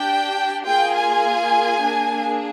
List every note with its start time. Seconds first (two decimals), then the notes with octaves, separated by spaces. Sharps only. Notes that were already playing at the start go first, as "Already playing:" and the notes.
Already playing: D4 G4 G5
0.66 A#3 F4 G#4 G5
0.96 G#5
1.82 A#3 D4 G#4